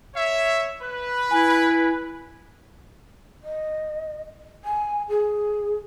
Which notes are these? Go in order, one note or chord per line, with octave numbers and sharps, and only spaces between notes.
C#5 E5
B4
E4 G#5
D#5
G#5
G#4